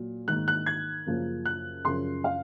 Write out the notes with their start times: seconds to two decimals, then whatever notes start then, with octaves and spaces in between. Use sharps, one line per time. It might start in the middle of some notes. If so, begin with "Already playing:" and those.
Already playing: A#2 F#3
0.27 G#2 D#3 A#3 F#6
0.48 F#6
0.66 G#6
1.06 F#2 C#3 F3 A#3
1.46 F#6
1.85 F#2 C#3 F3 C6
2.24 F5